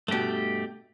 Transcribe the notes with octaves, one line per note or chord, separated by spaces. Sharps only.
G2 B2 A3 G4